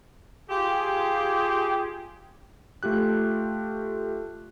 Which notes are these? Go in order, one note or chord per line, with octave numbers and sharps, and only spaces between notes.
F4 G4 G#4
A3 F4 G4 F#6